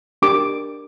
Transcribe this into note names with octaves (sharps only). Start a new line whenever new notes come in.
D4 G4 A#4 D6